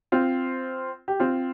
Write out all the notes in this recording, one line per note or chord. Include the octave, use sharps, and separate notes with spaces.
C4 F4
G4
C4 F4